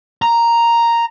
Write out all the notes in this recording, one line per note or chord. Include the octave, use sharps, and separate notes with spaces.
A#5